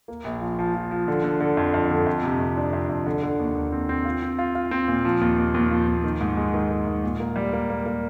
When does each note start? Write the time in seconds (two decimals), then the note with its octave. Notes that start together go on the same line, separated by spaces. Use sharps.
0.08 A#3
0.24 A#1
0.41 F3
0.59 F3
0.75 F3
0.91 F3
1.08 D3
1.24 D3
1.40 D3
1.57 F2
1.74 F2
1.91 D3
2.07 F2
2.23 C3
2.40 F2
2.57 D4
2.73 F2
2.89 F2
3.06 D3
3.23 D3
3.40 D#2
3.55 D#2
3.72 C4
3.89 C4
4.05 F4
4.22 C4
4.39 F4
4.55 F4
4.71 C4
4.88 A#2
5.05 F3
5.21 D#2
5.38 D#2
5.54 D#2
5.71 F3
5.88 D#2
6.04 D#3
6.21 G#2
6.37 G#3
6.54 D#3
6.70 D#3
6.87 G#2
7.03 A#2
7.20 A#3
7.36 G3
7.53 A#3
7.70 A#3
7.86 A#3